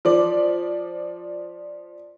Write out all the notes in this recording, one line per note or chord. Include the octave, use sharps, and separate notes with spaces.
F3 D5